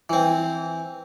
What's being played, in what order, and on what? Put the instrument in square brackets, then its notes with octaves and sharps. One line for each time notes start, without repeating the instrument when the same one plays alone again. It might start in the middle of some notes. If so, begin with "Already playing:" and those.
[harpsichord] E3 C4